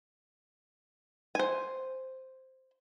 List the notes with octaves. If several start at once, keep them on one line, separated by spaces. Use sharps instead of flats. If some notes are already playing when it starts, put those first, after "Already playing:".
C5 G#5